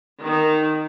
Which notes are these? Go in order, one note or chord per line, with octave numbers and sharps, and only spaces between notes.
D#3